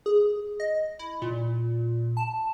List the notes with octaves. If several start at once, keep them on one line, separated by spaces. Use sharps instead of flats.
G#4
D#5
E4
A#2
A5